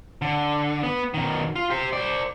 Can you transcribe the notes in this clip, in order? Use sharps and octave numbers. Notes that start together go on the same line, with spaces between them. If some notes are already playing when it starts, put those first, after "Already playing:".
D3
B3
B2 D#3
F4
G4 C5
C5 D5